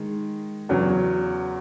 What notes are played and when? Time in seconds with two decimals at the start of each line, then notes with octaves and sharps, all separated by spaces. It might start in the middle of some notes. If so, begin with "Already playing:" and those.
Already playing: D#3 G#3
0.69 E2 C#3 F#3